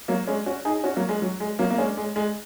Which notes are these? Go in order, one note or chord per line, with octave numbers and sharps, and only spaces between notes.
F#3 A#3
G#3 C#4
C#4 F#4
D#4 G#4
C#4 F#4
F#3 A#3
G#3
F#3
G#3
F#3 A#3
A#3
G#3 C#4
G#3
G#3